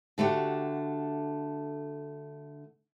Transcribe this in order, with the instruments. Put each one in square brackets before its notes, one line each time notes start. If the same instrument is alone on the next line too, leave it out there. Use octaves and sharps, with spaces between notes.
[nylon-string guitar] D3 A3 F#4 G4